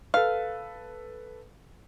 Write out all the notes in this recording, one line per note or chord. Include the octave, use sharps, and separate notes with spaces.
A4 B4 F5